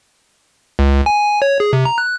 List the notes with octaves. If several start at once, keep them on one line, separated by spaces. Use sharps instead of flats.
C#2
G#5
C#5
G#4
C3
A#5
F#6